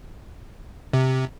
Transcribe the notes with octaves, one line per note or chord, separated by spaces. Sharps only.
C3